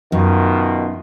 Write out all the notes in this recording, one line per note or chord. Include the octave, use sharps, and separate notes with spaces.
F#2 B2 D#3 F4